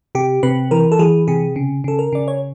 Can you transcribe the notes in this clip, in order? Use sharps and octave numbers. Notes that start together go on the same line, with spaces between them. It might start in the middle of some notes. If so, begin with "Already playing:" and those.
C3 G4
C3 B4
E3 A#4
A4
E3 G#4
C3 G#4
C#3
C#3 A4
A#4
C#3 D5
C#5